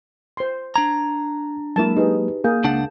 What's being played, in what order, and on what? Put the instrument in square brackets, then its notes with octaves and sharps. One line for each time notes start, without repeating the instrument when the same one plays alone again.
[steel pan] C5 C6
[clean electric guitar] D4 A#5 [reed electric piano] G#6
[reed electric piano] F#3 G#3 A#3 [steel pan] E4 A#4 A5
[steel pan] D#4 G#4 [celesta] G4 B4
[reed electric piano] A#3 [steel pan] G#4 A#4 [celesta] F5 G6
[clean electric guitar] C#2 D4 F#5 [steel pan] A5